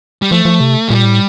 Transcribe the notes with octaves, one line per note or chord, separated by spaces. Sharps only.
G3
F3 A3
F3
C3
A#2 G3
A2